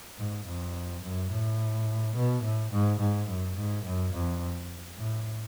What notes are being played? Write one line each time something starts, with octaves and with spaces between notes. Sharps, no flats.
G#2
F2
F#2
A2
B2
A2
G#2
G#2
F#2
G#2
F#2
F2
A2